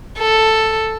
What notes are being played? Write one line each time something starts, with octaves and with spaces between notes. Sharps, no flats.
A4